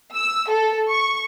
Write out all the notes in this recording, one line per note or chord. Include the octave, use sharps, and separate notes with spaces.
E6
A4
C#6